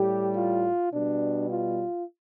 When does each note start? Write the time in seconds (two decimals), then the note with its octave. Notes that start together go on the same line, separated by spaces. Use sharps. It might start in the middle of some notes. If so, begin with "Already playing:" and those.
Already playing: A2 G3 G4
0.35 F4
0.92 B2 G3 D4
1.50 F4